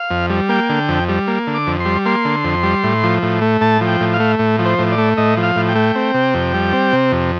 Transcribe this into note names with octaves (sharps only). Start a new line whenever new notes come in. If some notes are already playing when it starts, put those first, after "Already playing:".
Already playing: F5
F2
G3
A#3 G5
D3
F2
G3
A#3
D3
D6
F2
C6
G3
A#3 C6
D3
F2
G3
A2
F3
A2
A3
A2 A5
F3
G5
A2
F5
A3
A2
F3
C5
A2
D5
A3
A2 D#5
F3
F5
A2
G5
A3
C4
C3
F2
G3
C4
C3
F2